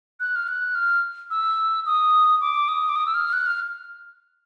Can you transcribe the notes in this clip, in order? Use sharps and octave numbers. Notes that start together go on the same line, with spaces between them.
F#6
F6
F#6
F6
E6
D#6
D6
D#6
D6
D#6
E6
F6
F#6
F6